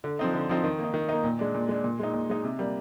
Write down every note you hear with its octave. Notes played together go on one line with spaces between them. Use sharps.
D3
F3 C4 D#4
D3
F3 C4 D#4
D#3
A#3 D#4
D#3
A#3 D#4
A#2
G#3 D4
A#2
G#3 D4
A#2
G#3 D#4
A#2
G#3 D#4
C3
G3 A#3